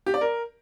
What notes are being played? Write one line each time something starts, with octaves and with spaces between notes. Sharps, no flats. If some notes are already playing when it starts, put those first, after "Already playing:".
G4
D5
A#4